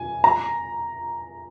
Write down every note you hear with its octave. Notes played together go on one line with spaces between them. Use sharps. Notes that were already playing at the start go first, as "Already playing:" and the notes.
Already playing: G#5
A#5